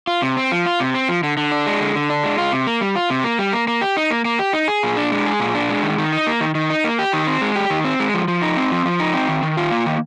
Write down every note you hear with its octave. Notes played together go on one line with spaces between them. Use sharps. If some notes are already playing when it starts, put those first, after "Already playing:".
F4
C3
C4
F3
F4
C3
C4
F3
D3
D3
D4
G#3
D3
D3
D4
G#3
F4
C3
A#3
G3
F4
C3
A#3
G3
A#3
A#3
G4
D#4
A#3
A#3
G4
D#4
G#4
A#2
D4
G#3
G#4
A#2
D4
G#3
D#3
D#3
D#4
A#3
D#3
D#3
D#4
A#3
G4
D#3
C4
G#3
G4
D#3
C4
G#3
F3
F3
D#4
C4
F3
F3
D#4
C4
D#3
D#3
F4
A#3
D#3